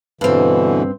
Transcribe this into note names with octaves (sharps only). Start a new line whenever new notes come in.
G2 B2 D3 E3 C4